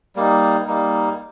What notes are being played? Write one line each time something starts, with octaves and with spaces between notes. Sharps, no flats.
G3 A#3 D#4
G3 A#3 D#4